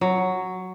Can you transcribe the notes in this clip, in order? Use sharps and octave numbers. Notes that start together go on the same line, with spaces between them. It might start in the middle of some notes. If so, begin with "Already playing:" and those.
F#3